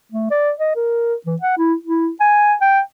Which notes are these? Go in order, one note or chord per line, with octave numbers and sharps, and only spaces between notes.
A3
D5
D#5
A#4
E3
F#5
E4
E4
G#5
G5